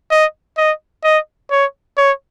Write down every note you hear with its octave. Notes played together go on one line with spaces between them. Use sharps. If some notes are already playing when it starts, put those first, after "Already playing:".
D#5
D#5
D#5
C#5
C#5